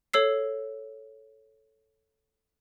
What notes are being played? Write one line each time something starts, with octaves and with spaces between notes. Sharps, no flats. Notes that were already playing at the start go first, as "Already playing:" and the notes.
A4 C#5 E6 C7